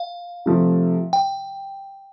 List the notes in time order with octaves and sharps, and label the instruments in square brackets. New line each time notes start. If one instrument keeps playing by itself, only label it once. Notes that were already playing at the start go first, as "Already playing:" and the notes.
Already playing: [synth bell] F5
[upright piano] C3 F3 A3
[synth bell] G5